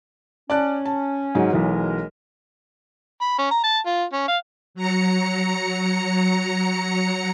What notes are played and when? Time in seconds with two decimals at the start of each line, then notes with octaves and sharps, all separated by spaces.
0.50 C#4 D5 A5 F#6
0.85 A5
1.35 G#2 F#3
1.51 B1 E3 F#3 G#3 A#4
3.21 B5
3.39 C#4
3.51 A#5
3.64 A5
3.86 F4
4.13 C#4
4.28 F5
4.74 F#3 A#5 C#7